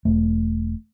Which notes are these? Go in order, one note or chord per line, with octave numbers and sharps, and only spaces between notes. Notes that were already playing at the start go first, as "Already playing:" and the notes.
E1 A3